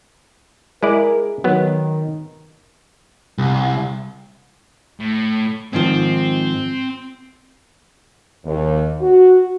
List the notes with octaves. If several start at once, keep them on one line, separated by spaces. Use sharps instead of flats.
G#3 E4 G#4 A#4 D5
D#3 F#3 B3
C2
A2
G#2 D#3 F3 C4
D#2
F#4